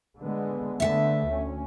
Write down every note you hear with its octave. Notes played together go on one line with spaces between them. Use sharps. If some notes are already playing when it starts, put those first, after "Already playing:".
D3 G#3 B3
D3 A3 B3 E5 F#5 A5
D2 C#4